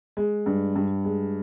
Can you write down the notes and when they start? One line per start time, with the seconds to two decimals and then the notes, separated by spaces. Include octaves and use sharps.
0.17 G#3
0.46 G2
0.76 G2
1.05 G#3